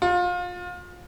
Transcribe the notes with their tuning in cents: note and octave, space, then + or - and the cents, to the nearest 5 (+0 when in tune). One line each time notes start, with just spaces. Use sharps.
F4 +30